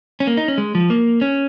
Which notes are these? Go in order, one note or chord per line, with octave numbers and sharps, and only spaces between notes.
C#4
A#3
D#4
C#4
G#3
F3
A#3
C#4